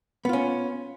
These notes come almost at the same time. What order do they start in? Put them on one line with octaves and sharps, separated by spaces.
B3 F4 C#4